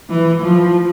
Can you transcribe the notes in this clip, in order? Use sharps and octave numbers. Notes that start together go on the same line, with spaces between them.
E3
F3